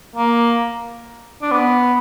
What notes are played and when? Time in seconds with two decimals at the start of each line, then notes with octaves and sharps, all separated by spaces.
0.16 A#3
1.42 D4
1.51 B3